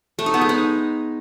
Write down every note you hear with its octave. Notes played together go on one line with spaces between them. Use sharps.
A3
D#4
B3
G#3
D#4